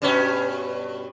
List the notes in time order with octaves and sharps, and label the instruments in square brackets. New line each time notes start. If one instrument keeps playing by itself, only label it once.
[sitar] G2 B2 C#4